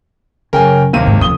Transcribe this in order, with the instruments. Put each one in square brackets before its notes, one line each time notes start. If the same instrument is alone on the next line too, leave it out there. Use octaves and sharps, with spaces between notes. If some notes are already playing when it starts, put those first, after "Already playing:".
[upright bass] F#2 [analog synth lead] C#3 [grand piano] A#4 G5 G#5
[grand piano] D#2 C3 D#7 [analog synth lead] A#3
[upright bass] F2 G#2
[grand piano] F1 D#6 G7 [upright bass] C#2 C#3